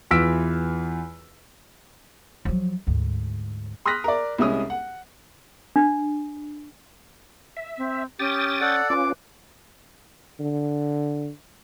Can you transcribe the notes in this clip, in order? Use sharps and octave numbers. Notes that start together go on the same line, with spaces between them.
E2 E3 F4 E6 B6 D7
F3 F#3
D2 G#2
C6 D#6 F6 F#6 A#6 B6
A#4 D5
C2 G3 G#3 C#4 D#6
F#5
D4
E5
C4
C#4 G4 G5 D#6 A6
A4 D5 F#5
C#4 F4 B4 D6
D3